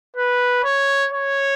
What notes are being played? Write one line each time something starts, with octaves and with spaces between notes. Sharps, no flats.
B4
C#5
C#5